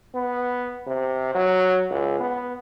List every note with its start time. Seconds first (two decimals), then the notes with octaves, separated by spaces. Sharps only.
0.15 B3
0.87 C3
1.35 F#3
1.91 C#2
2.20 B3